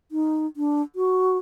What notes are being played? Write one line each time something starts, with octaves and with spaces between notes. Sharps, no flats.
D#4
D4
F#4